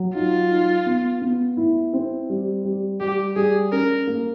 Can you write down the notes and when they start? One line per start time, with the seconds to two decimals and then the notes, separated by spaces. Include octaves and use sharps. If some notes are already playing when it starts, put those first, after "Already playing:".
Already playing: F#3
0.15 D#4 F4
0.51 D#4
0.86 B3
1.22 B3
1.57 E4
1.93 C4
2.30 G3
2.65 G3
3.00 G3 G4
3.36 G3 G#4
3.72 C#4 A#4
4.07 A#3